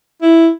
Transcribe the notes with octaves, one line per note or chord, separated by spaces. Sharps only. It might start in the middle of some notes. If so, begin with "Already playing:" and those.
E4